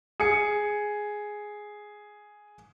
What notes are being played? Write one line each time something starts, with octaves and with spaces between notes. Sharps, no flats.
G#4 C#7